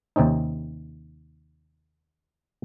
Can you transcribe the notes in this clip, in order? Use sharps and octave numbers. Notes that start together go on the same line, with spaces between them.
D#2 C3 C4 C#4 D#4